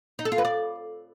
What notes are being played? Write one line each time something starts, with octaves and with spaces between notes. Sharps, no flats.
D#4
A4
F4
B4
D5